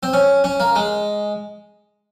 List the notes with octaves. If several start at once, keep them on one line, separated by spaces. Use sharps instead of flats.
C4
C#4
C#4
A#3
G#3